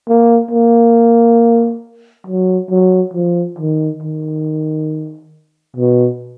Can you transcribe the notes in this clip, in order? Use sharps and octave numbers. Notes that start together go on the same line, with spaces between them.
A#3
A#3
F#3
F#3
F3
D#3
D#3
B2